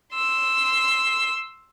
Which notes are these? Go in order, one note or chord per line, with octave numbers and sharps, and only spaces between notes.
C6 E6